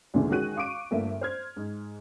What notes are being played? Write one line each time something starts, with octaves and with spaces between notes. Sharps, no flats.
D2 A#2 D3 E3 G#3
D#3 G#3 C#4 F#4 F#6 D#7
F5 C#6 D6 D7 D#7
G1 A3 A#3 E5
C5 F6 G#6
G#2